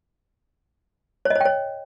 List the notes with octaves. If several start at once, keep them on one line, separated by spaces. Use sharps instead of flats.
C#5
D#5
C#5
G5
C#5